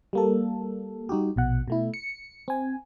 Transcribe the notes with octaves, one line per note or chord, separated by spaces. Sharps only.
G3 A#3 A4
G3 D#4 F#4 G4
A#1 B2 F#5
B2 A3 E4
C#7
C4 G#5